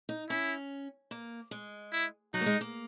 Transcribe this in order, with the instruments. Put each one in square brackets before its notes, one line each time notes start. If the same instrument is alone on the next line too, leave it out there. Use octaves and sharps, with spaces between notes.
[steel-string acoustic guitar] D#4
[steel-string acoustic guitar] C#4 [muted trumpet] E4
[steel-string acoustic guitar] A#3
G#3
[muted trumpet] E4
[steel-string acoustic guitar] F#3 [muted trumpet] D#4
[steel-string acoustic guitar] A#3
G#3
A#3